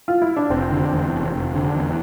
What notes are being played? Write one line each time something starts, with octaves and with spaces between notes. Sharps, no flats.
F4
E4
D4
F1 C4
D3
E2
F1
F1
D3
E2